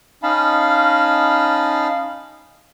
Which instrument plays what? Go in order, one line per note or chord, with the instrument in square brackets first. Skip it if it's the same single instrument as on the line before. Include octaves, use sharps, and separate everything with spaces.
[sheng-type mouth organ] C#4 D#4 F5 A5 B5